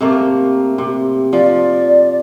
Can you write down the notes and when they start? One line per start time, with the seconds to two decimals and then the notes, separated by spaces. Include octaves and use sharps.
0.01 C3 A3 A#3
0.78 C3
1.33 F3 D5